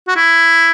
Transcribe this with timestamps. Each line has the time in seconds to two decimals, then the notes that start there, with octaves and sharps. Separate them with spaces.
0.08 F#4
0.17 E4